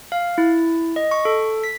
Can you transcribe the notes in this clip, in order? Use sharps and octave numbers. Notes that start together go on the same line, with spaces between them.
F5
E4
D#5
C#6
A4
B6